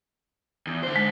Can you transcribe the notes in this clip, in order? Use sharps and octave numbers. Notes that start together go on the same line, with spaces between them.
E2
D3 C5
G#3